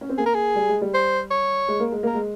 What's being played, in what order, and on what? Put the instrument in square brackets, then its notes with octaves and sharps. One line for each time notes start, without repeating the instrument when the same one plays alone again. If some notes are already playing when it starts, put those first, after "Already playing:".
[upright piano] C#4
C4
[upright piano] A#3 [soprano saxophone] G#4
[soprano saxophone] A#4
G#4
[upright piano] G3
G#3
G3
[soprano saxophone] C5
C#5
[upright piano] G#3
A#3
G#3
[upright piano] A#3 [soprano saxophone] A#4
[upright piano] G#3